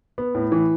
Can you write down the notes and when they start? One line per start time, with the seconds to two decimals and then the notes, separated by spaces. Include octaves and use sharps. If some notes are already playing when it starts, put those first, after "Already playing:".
0.18 B3
0.35 A2
0.52 E3